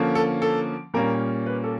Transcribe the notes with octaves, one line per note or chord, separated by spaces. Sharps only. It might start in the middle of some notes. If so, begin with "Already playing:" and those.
Already playing: D3 F3 A#3 C#4
A4
A4
A#2 G3 A#3 C#4 A#4
B4
A4